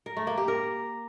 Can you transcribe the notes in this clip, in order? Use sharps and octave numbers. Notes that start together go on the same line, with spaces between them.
A#4
A3
A#3
G4
A#4